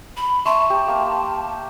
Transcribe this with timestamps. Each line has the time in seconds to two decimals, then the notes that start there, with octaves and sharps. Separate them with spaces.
0.17 B5
0.45 E5 A5 C6 C#6
0.70 G4
0.88 A#3